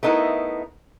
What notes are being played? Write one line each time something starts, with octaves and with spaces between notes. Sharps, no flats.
A3 B3 D#4 E4 A#4